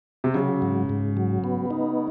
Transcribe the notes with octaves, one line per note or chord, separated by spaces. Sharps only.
C3
C#3 F#3
G#2
G#2
F#3
B3
D#4